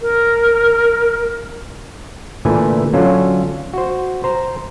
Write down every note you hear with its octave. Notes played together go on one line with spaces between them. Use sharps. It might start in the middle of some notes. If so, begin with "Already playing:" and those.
A#4
A#2 D3 E3 A3 B4 G#5
D3 F#3 C#4 F4 A4
F#4 C5
C5 A#5